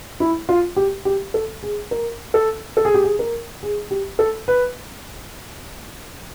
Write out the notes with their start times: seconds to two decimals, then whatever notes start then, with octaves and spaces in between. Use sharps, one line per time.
0.20 E4
0.49 F4
0.76 G4
1.05 G4
1.34 A4
1.63 G#4
1.91 A#4
2.34 A4
2.77 A4
2.85 G#4
2.94 G4
3.04 G#4
3.19 A#4
3.63 G#4
3.91 G4
4.19 A4
4.48 B4